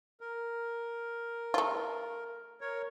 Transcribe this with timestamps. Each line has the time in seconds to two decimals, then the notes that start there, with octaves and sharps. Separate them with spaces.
0.21 A#4
1.54 A3 F4
2.61 A#4 C#5